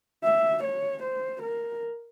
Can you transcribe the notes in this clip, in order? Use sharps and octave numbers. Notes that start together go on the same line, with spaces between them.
E5
C#5
C5
A#4